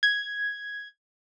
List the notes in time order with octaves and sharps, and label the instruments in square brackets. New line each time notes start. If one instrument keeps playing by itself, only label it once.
[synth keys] G#6